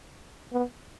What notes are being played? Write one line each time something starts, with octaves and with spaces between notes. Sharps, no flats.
B3